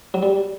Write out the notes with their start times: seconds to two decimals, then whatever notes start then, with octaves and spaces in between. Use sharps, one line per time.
0.14 F#3
0.23 G3